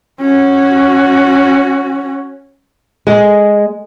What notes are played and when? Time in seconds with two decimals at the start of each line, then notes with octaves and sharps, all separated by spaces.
0.21 C#4 F#4
3.07 G#3